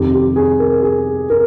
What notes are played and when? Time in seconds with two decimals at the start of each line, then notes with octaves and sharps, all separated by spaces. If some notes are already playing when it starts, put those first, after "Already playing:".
Already playing: F2 C3 D#3 G4
0.14 G4
0.36 G#4
0.59 A#4
0.83 G#4
1.30 A#4